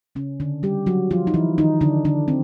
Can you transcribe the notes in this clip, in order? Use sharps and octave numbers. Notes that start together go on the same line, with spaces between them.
C#3 C#4
D3 D4
G3 G4
F#3 F#4
F3 F4
D#4
E3 E4
D#3 D#4
D3 D4
D3 D4
C4